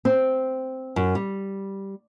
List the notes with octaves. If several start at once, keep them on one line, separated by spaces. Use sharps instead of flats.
C4
F#2
G3